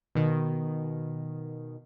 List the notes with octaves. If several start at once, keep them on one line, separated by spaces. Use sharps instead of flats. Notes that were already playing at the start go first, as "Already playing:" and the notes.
B2 D#3